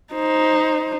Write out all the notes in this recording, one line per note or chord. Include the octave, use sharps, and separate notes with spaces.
D#4 C5